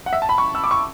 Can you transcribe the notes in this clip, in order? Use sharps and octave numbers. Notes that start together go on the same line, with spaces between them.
F#5
E5
A5
B5
C#6
E6
D6
C#6